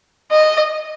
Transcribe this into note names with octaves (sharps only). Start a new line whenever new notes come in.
D#5